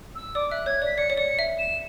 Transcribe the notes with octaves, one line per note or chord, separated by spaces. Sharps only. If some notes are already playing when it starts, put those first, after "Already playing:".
E6
D5 D6
E5 F#6
C#5 G#6
D5 B6
D5 C#7
C#5
D5 C#7
E5
E7